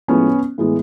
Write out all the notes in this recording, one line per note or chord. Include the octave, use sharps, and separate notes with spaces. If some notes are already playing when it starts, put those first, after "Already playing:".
A2 F3 G#3 B3 C#4
A2 E3 G#3 B3